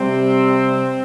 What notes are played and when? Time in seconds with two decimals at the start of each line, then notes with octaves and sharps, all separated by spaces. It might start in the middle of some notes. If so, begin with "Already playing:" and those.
Already playing: C3 G3 C4